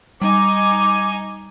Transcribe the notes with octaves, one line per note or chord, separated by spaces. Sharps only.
G3 D#4 G#5 D6